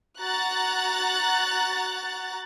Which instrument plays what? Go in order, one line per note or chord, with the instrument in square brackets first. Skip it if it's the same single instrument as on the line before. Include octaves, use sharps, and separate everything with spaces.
[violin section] F#4 A#5 F#6 A6